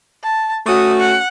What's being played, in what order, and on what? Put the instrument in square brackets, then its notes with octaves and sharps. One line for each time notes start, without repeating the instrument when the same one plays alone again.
[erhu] A5
[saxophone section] A3 C#4 F#4 [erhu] D#6
[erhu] F#5